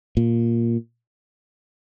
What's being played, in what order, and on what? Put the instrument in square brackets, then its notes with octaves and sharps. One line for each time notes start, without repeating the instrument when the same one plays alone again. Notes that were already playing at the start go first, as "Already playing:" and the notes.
[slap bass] A#2